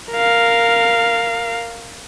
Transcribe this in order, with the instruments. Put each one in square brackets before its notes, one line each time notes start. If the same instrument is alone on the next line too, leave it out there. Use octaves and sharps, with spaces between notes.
[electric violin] A#4 F5